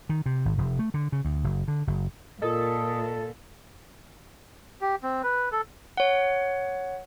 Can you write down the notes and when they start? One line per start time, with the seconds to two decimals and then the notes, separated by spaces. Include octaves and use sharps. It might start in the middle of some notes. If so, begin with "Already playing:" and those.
0.09 D#3
0.26 C3
0.45 G#1
0.58 F1
0.79 A3
0.94 D3
1.12 C#3
1.25 D2
1.44 F#1
1.68 D3
1.87 F#1
2.42 A#2 F4 A4 A#4 D#5 D#6
4.81 G4
5.03 C4
5.23 B4
5.52 A4
5.97 C#5 F#5